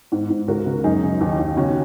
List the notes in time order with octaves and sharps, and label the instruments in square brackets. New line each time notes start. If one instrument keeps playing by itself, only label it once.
[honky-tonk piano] G#2
G#2
C#2 F#4 A#4
C#3
F#2 D#4 G#4
C#3
D#2
D#2
C#3 C#4 F#4